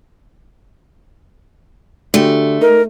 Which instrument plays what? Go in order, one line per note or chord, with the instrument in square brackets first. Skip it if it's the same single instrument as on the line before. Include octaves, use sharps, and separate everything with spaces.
[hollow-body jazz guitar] D3 F#4 G4 [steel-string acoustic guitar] A3
[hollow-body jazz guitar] D#4 [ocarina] A#4